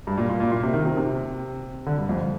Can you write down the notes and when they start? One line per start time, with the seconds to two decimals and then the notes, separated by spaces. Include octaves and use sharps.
0.07 G2
0.18 A#2
0.29 A#2
0.40 A#2
0.52 A#2
0.63 C3
0.73 D#3
0.86 C3
0.97 C3
1.86 D3
1.98 G2
2.09 F2